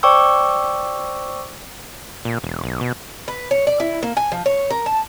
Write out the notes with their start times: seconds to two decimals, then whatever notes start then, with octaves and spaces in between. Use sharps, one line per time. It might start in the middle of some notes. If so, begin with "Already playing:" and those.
0.03 C5 D5 G5 C#6 D6 E6
2.25 A#2
2.44 E1
2.64 B1
2.81 B2
3.28 B4
3.51 C#5
3.67 D5
3.80 E4
4.03 A#3
4.17 G#5
4.32 F3
4.46 C#5
4.70 A#4
4.86 A5